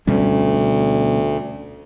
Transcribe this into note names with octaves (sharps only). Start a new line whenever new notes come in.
D2 B2 G3 C#4